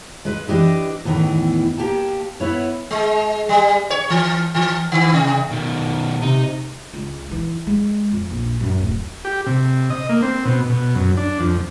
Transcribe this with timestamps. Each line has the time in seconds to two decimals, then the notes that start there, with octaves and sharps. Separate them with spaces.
0.25 G#3 B4
0.47 E3 D4 G4 D#5 E5
1.05 E2 A2 D#3 E3
1.78 A#3 G4 G5 A5
2.40 B3 E4 C#5
2.91 G#3
3.49 G3
3.90 C#5
4.10 E3
4.55 E3
4.92 D#3
5.13 C3
5.51 B2 D#3
6.22 C3 D#4
6.93 C#2
7.31 E3
7.67 G#3
8.11 F2
8.30 A#1
8.60 F#2
8.80 D1
9.25 G4
9.46 C3
9.90 D#5
10.09 A#3
10.22 C4
10.45 B2
10.69 B2
10.95 F#2
11.17 D4
11.40 F2